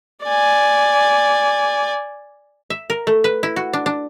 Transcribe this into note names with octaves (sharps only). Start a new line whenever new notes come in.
D5 G#5
E5
A#4
A3
B4
E4
F#4
D4
D4